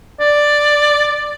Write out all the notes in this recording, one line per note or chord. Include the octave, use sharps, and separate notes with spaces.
D5